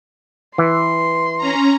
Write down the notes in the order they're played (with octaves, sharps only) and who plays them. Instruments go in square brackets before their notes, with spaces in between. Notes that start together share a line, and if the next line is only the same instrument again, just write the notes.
[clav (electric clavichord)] E3 [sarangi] C6
[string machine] C#4 A#5